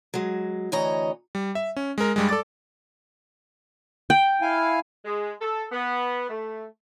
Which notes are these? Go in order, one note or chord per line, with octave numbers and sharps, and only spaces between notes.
F#3 G#3
D2 E3 C#5 D#5 A#5
G3
E5
C#4
G#3 A#4
G2 G3 G#3
A4 D5 D6 A6
G5
E4 F5 G#5
G#3
A4
B3
A3